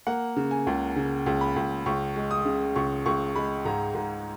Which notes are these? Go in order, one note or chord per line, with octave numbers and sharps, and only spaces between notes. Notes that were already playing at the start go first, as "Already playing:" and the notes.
A#3 F#5
C#3
G#5
C#2
C#3
C#2
B5
C#2
C#2 C#6
G#3
D#6
C#3
C#2 C#6
C#2 C#6
G#3 B5
G#2 A#5
G#2